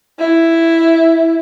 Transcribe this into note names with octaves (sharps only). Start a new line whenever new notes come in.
E4